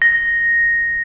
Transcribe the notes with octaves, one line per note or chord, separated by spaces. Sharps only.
A#6